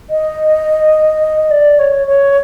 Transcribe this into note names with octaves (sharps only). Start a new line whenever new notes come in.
D#5
D5
C#5
C#5